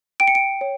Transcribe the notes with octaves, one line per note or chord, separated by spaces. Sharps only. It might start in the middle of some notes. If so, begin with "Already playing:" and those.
G5 D7
C#7
D7
C#5